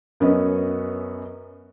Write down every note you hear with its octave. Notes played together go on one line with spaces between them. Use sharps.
F#2 B3 C#4 B4 D#5